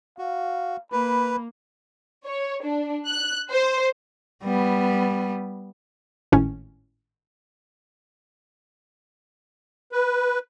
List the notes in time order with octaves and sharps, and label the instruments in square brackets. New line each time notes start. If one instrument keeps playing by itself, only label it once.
[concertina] F#4 [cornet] F5
[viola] A#3 [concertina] B4 [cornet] B5
[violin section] C#5
D4
F#6
C5
[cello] G3 B3
[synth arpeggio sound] G#1 A2 C#4
[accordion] B4